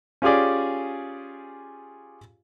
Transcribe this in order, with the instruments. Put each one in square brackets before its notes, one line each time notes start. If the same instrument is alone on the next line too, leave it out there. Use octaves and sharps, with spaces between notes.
[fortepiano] C#4 F4 G4 G#4 D5